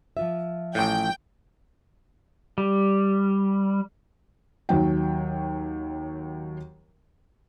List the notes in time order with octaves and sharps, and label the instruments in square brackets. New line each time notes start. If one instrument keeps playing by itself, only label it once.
[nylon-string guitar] F3 F4 E5
[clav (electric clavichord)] A1 A2 [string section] G5
[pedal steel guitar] G3
[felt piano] D#2 F#3 G5